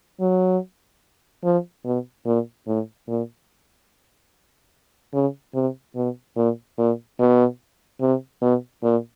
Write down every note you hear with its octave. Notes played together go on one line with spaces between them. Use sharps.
F#3
F3
B2
A#2
A2
A#2
C#3
C3
B2
A#2
A#2
B2
C3
B2
A#2